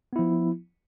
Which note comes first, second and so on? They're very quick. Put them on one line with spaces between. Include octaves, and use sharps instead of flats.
B3 E4 F3